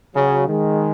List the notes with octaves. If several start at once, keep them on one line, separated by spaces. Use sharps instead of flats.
C#3 F#3
D#3 G#3